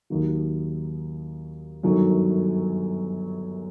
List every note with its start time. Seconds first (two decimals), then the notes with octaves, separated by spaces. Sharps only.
0.10 D#2 D#3 F#3
1.83 G1 F#2 D#3 F#3